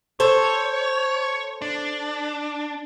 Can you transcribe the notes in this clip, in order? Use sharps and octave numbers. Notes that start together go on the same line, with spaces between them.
A4 C5 C#5
D4